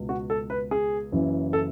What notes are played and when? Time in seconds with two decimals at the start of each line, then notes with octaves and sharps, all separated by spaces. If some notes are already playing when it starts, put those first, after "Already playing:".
Already playing: C#2 B2
0.09 F#4
0.30 A4
0.50 B4
0.71 G#4
1.12 F#1 F#2 C#3 E3
1.53 A4